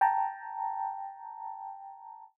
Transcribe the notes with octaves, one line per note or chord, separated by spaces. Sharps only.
G5 A5 A#5